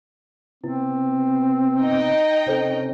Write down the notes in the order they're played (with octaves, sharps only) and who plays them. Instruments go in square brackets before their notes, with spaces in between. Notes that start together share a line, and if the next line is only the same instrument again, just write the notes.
[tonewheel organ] C3 B3 [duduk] C4 [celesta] E4
[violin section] D#4 D#5 G5
[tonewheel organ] C3 C#4 [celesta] A4 C5 G7